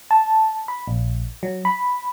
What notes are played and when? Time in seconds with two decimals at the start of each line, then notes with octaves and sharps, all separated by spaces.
0.11 A5
0.68 B5
0.88 A#1
1.43 F#3
1.65 B5